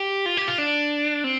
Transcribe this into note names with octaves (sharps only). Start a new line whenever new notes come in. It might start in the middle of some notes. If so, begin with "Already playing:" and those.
Already playing: G4
F4
G4
F4
D4
C4